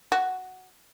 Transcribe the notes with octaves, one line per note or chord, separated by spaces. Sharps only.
F#4